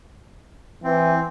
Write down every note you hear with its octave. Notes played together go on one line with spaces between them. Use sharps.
E3 C4